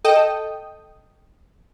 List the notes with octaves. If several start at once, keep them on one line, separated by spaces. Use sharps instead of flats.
A4 D#5 G5 D#6